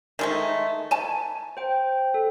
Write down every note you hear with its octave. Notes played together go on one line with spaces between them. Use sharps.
D#3 G#3 A3
G#5 A5
C5 G5
A4